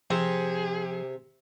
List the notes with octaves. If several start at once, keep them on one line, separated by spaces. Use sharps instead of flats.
C3 F3 C4 G#4